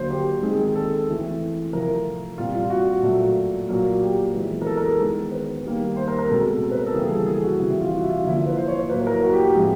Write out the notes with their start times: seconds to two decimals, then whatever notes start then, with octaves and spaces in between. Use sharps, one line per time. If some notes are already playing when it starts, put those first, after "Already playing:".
Already playing: D3 F#3 A#3 C5
0.11 G4
0.43 D#3 G#3 C4 G#4
0.53 G#4
0.64 G#4
0.75 A4
1.08 E3 A3 C4
1.73 C3 F3 A3 C4 A#4
2.38 A#2 G3 C4 F4
2.55 F4
2.70 F#4
3.03 A#2 F#3 A3
3.69 A#2 F#3 A#3
4.01 G4
4.33 E3 G#3 B3
4.62 A#4
4.66 A4
4.77 A#4
4.88 G#4
4.99 D#3 G#3 B3
5.32 B4
5.64 D#3 G3 A#3
5.97 C5
6.08 A#4
6.19 A#4
6.29 B2 G#3 C4 A4
6.71 B4
6.79 A#4
6.86 A4
6.94 C#3 E3 G3 A#3 G#4
7.06 G#4
7.15 A4
7.26 G#4
7.43 F#4
7.59 C3 E3 G3 F#4
7.70 E4
7.81 F4
7.93 F#4
8.03 E4
8.09 F4
8.24 D3 F3 A#3 E4
8.36 F4
8.47 B4
8.57 C5
8.68 C#5
8.79 C#5
8.89 A2 F#3 A#3 B4
9.07 A#4
9.23 F#4
9.33 G4
9.44 G4
9.55 A2 F3 G#3 C4 G#4